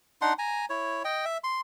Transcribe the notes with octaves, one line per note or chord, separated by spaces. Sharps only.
D4 D#4 F#5 C6
G#5 A#5
E4 C#5
D#5 G5
E5
C6